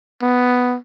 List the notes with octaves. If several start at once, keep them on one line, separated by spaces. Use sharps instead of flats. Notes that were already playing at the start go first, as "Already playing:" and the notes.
B3